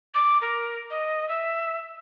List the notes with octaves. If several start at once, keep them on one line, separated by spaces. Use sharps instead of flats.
D6
A#4
D#5
E5